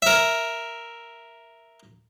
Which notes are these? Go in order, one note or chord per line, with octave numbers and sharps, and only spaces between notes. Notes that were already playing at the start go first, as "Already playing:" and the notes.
A#4 E5